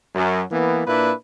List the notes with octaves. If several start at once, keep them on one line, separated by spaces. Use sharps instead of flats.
F#2
E3 A#3 B3
A#2 A#3 D4 E4 B4